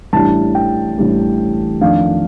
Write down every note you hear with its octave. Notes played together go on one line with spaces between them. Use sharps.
A1 A2 G3 D4 A5
G5
A1 A2 G3 D4
F2 D#3 A3 D4 F5